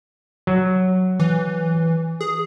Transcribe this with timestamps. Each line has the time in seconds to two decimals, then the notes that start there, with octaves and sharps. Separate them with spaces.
0.47 F#3
1.20 E3
2.21 G#4